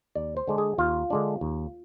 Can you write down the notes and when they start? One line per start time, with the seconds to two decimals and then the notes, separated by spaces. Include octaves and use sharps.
0.15 D#2 D5
0.37 C5
0.48 D3 G#3 D4
0.58 G#4
0.78 D#2 F4
1.10 D3 G#3 D4
1.41 D#2